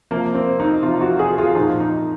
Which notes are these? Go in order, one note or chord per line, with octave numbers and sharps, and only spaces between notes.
C3 F3 A#3
C4
D#4
C3 F3 F4
F#4
G#4
F4
A#2 F3 D#4
D#4